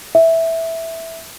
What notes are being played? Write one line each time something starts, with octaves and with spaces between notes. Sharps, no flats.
E5